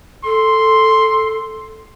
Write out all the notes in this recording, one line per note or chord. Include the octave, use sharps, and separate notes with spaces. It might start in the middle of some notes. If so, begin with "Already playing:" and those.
A4 C6